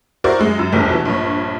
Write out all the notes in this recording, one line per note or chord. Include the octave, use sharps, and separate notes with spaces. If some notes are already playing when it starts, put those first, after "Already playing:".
E4 F#4 A#4 C5 D5
F#2 G#3
F#2
F1 A#1 E2 G3
B2 E3
A#1 G2 C#5